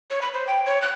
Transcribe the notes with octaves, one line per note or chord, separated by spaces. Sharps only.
C#5
B5
C5
G5
C#5
F#6